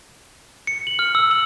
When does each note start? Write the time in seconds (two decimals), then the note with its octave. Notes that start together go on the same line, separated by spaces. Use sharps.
0.67 C#7
0.87 F#7
0.99 F6
1.15 E6
1.31 F#7